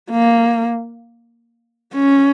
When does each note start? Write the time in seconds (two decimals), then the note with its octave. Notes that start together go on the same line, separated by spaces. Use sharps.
0.10 A#3
1.94 C#4